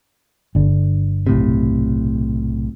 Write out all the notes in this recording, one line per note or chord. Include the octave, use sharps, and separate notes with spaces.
G1 D3
B1 A2 C3